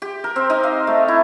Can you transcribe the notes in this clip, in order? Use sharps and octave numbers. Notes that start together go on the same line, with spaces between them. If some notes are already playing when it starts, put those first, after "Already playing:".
G4
A#4
C4
D#4
F5
A3
E4